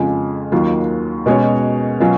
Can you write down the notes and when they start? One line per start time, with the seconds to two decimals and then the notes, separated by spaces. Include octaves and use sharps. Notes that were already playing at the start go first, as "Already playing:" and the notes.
Already playing: F2 C#3 G#3 C#4 F4
0.52 D#2 D#3 F#3 A#3 F4
1.26 B2 G#3 C#4 F#4 C#5
2.00 B2 F#3 C#4 F4